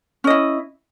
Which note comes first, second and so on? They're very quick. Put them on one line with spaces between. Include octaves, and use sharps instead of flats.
C#4 D#5 E4